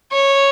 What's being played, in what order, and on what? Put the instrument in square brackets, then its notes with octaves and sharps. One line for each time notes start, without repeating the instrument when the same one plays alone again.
[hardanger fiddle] C#5